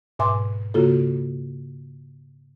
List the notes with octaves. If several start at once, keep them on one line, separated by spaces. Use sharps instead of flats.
G#2 B2 E5 G#5 C6 D6
C#3 A#3 F4 F#4 A4